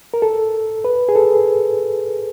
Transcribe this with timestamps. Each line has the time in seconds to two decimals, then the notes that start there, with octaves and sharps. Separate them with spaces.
0.14 A#4
0.22 A4
0.85 B4
1.09 G#4
1.16 A4